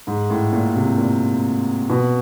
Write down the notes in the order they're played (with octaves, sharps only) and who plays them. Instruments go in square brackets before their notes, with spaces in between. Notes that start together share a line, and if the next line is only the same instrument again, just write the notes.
[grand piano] G#2
A2
A#2
C3
A#2
B2